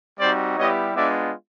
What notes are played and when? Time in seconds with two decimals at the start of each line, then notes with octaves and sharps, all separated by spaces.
0.19 G3 C4 D#4 F#4 C5 D5
0.57 G3 B3 E4 G4 C#5 D#5
0.95 G#3 B3 D4 F4 D5 E5